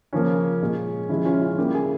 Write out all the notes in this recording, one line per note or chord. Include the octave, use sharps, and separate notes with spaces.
C#3 F3 A#3 C#4
A#2 G#3
C#3 F3 G#3 E4
C#4 F4
C#4 F4
C#3 G3 A#3 E4 G4
F4 G#4